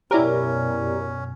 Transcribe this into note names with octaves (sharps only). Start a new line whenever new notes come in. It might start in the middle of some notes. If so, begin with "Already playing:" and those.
F#2 B2 C#4 E4 G4 A#4 C#5 D5